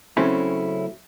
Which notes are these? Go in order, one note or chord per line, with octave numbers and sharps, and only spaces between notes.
C#3 F#3 A3 C4 C#4 E4